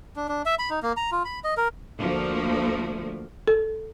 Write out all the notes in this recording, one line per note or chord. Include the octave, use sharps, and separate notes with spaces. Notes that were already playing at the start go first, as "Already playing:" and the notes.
D4
D4
E5
B5
D#4
A#3
A#5
F4
B5
D#5
A#4
D2 F3 A3 A#3
A4